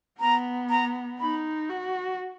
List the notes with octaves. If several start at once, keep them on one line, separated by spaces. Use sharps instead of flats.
B3 A#5
A#5
D#4 B5
F#4